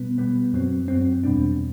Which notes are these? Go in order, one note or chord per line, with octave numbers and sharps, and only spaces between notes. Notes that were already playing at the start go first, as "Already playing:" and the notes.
Already playing: B2 G3 B3
B2 G3 B3
F#2 F#3 C4
F#2 F#3 C4
E2 B2 G3 D4